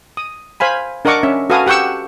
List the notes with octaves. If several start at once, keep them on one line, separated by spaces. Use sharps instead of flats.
D#6
C5 F5 G#5 B5
D4 A#4 D#5 F#5 C#6 D6
C#4 E5
F#4 A4 B4 F5 G#5 D#6
G4 F#5 G5 C#6 E6